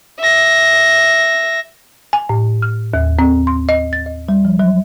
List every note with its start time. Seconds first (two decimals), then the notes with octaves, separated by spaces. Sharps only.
0.20 E5 A#6
2.13 G#5
2.29 A2
2.62 F6
2.94 D#2
3.19 C4
3.47 C6
3.69 D#5
3.93 A6
4.06 D#5
4.29 G3
4.45 F3
4.59 F#3